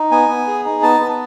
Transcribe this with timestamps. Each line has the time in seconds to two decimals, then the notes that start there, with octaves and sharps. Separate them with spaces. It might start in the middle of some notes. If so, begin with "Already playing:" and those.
Already playing: D#4
0.11 B3 G#5
0.29 B3
0.47 G#4
0.65 D#4
0.83 B3 A5
1.00 B3